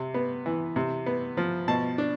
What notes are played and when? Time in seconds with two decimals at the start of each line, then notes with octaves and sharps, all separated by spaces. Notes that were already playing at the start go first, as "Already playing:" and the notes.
Already playing: C3
0.14 B3
0.46 E3
0.76 C3
1.06 B3
1.37 F3
1.68 B2 A5
1.98 D4